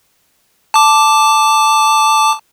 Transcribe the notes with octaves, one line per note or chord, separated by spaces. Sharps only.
A5 D6